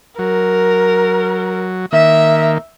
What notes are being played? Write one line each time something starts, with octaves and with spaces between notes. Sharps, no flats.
F#3 A#4
D#3 A#3 E5